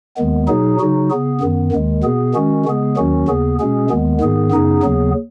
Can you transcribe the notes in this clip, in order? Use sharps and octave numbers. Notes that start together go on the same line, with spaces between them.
D#2 D#3 G#3 B3
B2 F#3 D#4 G#4
C#3 F#3 D#4 F#4
C#3 B3 G#4
F#2 D#3 B3
D#2 D#3 G#3
B2 B3 G#4
D#3 G#3 C#4 F#4
C#3 G#3 B3 G#4
D#2 D#3 F#3 C#4 F#4
D#2 C#3 B3 G#4
B2 G#3 C#4 G#4
D#2 D#3 G#3 B3
G#2 D#3 B3 G#4
F#2 C#3 B3 D#4 G#4
D#2 C#3 F#3 B3 G#4